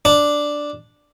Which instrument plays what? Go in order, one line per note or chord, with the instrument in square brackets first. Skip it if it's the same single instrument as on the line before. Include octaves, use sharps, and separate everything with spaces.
[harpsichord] D4